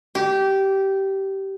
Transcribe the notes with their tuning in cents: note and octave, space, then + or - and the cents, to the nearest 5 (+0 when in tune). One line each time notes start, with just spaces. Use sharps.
G4 -15